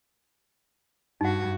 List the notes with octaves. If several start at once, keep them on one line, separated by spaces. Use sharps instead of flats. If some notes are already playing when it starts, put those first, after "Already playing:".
G2 D#4 F#4 F#5